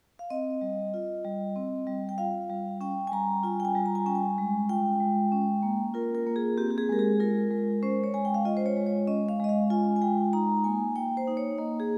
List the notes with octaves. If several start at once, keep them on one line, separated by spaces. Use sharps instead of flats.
F5
C4 D#5
G3
F4
G3
C4
G3
G5
F4 F5
G3
C#4 G5
G#5
G3 A#5
F4 G#5
G5
G#5
G3
A#5
G#5
C#4 G5
G#5
G#3
F4 G5
G#3
C#4
A#3
F4 A#4
A#4
A#3
G#4
C4 G4
G4
G#4
G#3 A#4
G#4
F4 A#4
G#3
C#4 C5
C#5
G#3 G#5
G5
F5
F4 D#5
C5
C#5
G#3
C#5
C#4 D#5
F5
G#3 D#5
F5
F4 G#5
G#5
G#3 G5
D#4 A#5
A#3 G#5
A#3 G5
C5
D#4
C#5
A#3 D#5
G#4